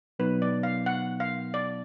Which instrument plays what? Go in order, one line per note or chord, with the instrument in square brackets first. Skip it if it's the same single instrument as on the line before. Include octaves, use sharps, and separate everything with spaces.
[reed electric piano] B2 F#3 B3 D#4 [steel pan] B4
[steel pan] D5
F5
F#5
F5
D5